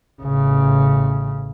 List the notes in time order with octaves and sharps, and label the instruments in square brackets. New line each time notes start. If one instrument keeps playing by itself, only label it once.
[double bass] A1 C#3